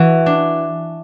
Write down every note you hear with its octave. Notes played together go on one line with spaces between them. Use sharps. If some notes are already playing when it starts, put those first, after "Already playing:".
Already playing: E3 F#4
D4